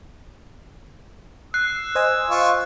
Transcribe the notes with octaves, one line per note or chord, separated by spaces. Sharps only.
E6 F#6 C7
C5 D#5 G#5
F4 C#6